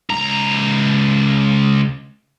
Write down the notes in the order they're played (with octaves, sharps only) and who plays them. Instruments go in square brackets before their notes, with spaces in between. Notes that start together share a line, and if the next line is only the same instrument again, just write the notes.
[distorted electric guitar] C#2 A#5